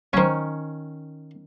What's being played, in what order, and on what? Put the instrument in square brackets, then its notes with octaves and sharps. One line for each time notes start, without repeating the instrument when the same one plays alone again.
[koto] D#3 C#4 [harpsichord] F#3 C5